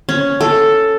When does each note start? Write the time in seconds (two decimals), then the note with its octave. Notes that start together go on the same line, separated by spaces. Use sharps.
0.09 C#4
0.41 A4